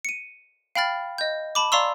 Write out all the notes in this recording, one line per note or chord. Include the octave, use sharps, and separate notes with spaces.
C#7 D#7
F5 G5 B5 F6 A6
D#5 G6
A5 B5 D6
D5 F5 A#5 C6 C#6 E6